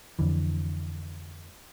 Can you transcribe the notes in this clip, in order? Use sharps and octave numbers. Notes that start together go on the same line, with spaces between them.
F2 D3 E3